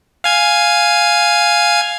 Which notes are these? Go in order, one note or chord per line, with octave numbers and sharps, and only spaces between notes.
F5 G#5 G#6